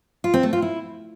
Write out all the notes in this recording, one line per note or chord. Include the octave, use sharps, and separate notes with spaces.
F4
C4
A3
F4
E4